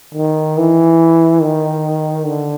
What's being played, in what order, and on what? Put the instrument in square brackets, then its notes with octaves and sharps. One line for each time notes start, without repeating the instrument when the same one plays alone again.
[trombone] D#3
E3
D#3
D3